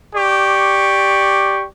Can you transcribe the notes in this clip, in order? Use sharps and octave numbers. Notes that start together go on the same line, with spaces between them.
G4 D5 C#6